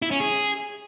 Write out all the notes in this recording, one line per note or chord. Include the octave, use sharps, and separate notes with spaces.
E4
C#4
G#4